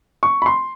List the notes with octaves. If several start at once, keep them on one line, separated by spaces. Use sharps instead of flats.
C#6
B5
C6